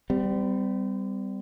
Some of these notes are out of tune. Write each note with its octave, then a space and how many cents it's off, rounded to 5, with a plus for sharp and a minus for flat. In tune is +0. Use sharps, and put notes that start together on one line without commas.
G3 +0 C4 -35